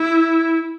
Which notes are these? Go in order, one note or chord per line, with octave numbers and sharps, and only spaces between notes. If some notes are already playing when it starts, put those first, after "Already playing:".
Already playing: E4